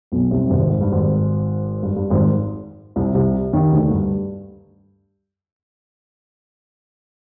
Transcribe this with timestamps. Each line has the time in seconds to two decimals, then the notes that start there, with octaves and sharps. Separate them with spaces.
0.12 B1 B2
0.31 C2 C3
0.45 G2
0.50 G#1 G#2
0.69 G#2
0.81 G2
0.92 G#1 G#2
1.83 G2
1.96 G2
2.10 G#1 G#2
2.96 C2 C3
3.14 C2 C3
3.53 D#2 D#3
3.71 D2 D3
3.90 G2